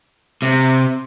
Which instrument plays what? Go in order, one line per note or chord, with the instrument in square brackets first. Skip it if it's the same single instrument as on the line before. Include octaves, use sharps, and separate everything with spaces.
[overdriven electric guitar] C3